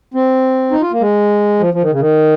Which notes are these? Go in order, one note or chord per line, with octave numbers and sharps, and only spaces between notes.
C4
D#4
F4
A#3
G#3
F3
F3
D#3
C#3
D#3